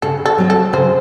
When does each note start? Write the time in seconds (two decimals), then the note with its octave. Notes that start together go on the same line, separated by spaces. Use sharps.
0.02 C#3 A4
0.26 A4
0.38 F#3 C4
0.50 A4
0.73 C#3 C5